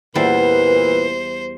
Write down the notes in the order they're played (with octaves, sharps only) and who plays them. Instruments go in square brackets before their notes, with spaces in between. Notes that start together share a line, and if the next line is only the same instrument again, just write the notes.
[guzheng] E2 G3 E4 [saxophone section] A#2 E3 [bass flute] B4 [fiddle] C5